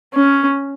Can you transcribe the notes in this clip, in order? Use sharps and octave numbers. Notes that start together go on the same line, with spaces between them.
C#4